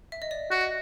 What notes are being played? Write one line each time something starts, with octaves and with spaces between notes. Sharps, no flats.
E5
D#5
D5
F#4 E5
D#5